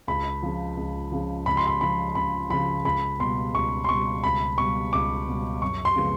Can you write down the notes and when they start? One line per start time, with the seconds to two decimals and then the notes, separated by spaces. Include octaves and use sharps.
0.07 C#2 B5
0.43 C#3 F3
0.77 C#2
1.12 C#3 F3
1.46 C#2 B5
1.57 C6
1.67 B5
1.81 C#3 F3 B5
2.15 C#2 B5
2.50 C#3 F3 B5
2.84 C#2 B5
3.19 B2 G3 C6
3.55 C#2 C#6
3.84 C6
3.89 B2 G3 C#6
4.24 C#2 B5
4.58 B2 G3 C#6
4.93 C#2 D6
5.27 B2 G3
5.62 F#2 C#6
5.85 C6
5.96 C#3 F3 G#3 B3